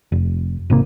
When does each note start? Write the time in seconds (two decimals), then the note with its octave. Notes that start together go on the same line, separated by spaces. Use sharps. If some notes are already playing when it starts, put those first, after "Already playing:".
0.12 F1
0.70 G#1 C3 A#3